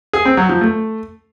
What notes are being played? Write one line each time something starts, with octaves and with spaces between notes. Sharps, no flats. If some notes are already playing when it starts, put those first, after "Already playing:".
G#4
C4
F#3
F3
A3